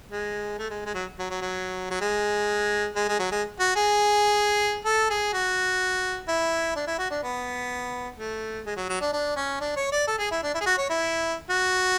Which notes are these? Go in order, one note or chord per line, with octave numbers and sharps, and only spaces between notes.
G#3
A3
G#3
G#3
F#3
F#3
F#3
F#3
F#3
G#3
G#3
G#3
F#3
G#3
F#4
G#4
A4
G#4
F#4
E4
D4
E4
F#4
D4
B3
A3
G#3
F#3
F#3
D4
D4
C#4
D4
C#5
D5
A4
G#4
E4
D4
E4
G#4
F#4
C#5
E4
F#4